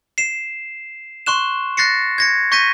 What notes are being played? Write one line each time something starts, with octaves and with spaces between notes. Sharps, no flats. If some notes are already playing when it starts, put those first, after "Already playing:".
C7 E7
C6 C#6 F#6 E7
F#6 A6 A#6 C7 C#7
G#6 A#6 C#7
C#6 G6 A#6 B6 D#7